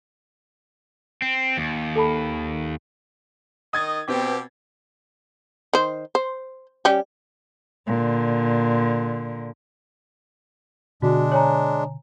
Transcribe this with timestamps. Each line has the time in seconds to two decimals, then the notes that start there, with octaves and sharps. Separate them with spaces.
1.22 C4
1.57 D#2
1.96 A4 A5 B5
3.73 D#3 D#5 D#6 G#6 A6
4.08 B2 B3 C4 G4
5.73 D#3 C5
6.15 C5
6.85 G3 C#4 G4
7.87 A#2 D3
11.02 B2 D3 G#3 D4 F#4
11.32 C#5 G#5 A#5